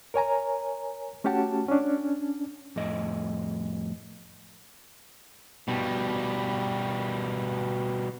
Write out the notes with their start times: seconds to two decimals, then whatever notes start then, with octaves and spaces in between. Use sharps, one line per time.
0.14 A#4 C#5 G#5 A#5
1.24 A3 C#4 F#4 G4 F#5 A5
1.69 C#4 D4
2.76 F2 A2 D#5
5.68 B2 G3